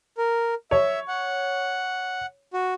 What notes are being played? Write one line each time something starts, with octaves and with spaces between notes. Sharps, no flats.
A#4
C#5 E5
F#5
F#4